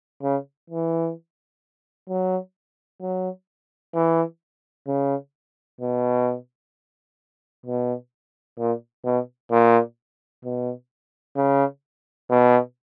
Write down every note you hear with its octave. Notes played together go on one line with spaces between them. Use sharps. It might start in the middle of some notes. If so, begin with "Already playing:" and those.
C#3
E3
F#3
F#3
E3
C#3
B2
B2
A#2
B2
A#2
B2
C#3
B2